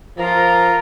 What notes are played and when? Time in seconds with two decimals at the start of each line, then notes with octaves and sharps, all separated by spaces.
0.18 F3 F4 A#4